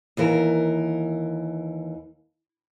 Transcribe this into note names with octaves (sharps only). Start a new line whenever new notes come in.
D#2 E3 A#4